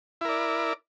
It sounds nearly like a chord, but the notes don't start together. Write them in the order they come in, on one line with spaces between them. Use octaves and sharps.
E4 A#4 D5